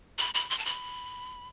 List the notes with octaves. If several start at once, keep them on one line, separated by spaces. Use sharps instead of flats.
B5
B5
C6
A5
B5